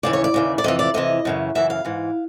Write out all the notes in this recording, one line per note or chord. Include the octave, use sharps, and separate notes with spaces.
D#2 C#3 E3 D5
C#5
D5
D#2 C#3 E3
D5
F2 C3 E3 D#5
D5
F2 C3 E3 D#5
F#2 C#3 E3
F#2 C#3 E3 E5
F5
G#2 E3